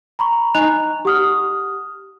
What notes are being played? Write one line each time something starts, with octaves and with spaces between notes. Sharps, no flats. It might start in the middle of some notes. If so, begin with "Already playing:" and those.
A#5 B5 C#6
D#4 D#5 G#5 A#5 F#6 F7
G4 F#5 D#6 F6